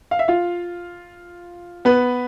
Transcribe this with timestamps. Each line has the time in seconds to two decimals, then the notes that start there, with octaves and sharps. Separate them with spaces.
0.11 F5
0.19 E5
0.28 F4 F5
1.85 B3 B4